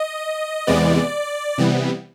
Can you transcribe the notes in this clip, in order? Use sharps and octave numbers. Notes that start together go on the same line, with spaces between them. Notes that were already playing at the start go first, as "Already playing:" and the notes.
Already playing: D#5
E2 C3 E3 G#3 B3 D5
C3 E3 G3 B3